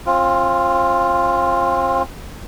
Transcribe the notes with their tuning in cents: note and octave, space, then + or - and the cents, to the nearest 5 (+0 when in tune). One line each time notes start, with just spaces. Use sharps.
C4 +35 F4 +0